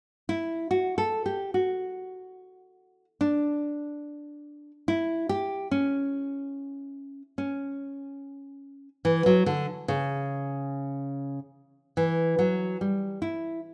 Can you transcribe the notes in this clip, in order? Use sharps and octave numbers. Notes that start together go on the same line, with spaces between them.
E4
F#4
A4
G4
F#4
D4
E4
G4
C#4
C#4
E3
F#3
D3
C#3
E3
F#3
G3
E4